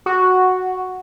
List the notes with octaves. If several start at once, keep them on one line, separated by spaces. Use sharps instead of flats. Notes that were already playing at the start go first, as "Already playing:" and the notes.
F#4